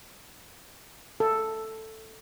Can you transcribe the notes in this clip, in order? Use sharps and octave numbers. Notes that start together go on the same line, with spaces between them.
A4